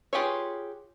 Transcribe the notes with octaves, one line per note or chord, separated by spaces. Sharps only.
F4 G4 G#4 B4 C#5